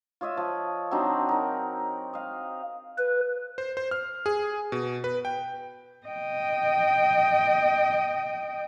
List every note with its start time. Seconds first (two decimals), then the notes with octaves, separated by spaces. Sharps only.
0.21 F4 C#5 D#5 E5
0.37 F3
0.91 F#3 C4 D4 D#4
1.29 D#4 A#4
2.13 D#5 F5
2.98 B4
3.58 C5
3.77 C5
3.91 F6
4.26 G#4
4.72 B2
5.04 B4
5.25 G5
6.07 D#5 G5